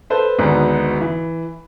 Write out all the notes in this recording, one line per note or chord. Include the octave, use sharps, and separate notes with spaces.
A4 B4 C5
G#1 D2 G#2 B3 D#4
E3